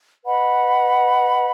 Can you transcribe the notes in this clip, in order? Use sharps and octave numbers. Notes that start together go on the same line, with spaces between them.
B4 D#5 F#5 B5